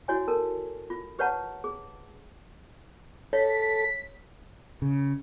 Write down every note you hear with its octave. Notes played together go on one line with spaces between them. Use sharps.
E4 F#4 C#5 G#5
A4 A#4 A5
F4
G4 B4 C#5 F#5 A5 A#5
G#4
A4 C#5 B6
C#3